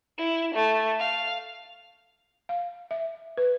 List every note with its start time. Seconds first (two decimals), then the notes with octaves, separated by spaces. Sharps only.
0.18 E4
0.54 A3
1.00 F5
2.49 F5
2.91 E5
3.37 B4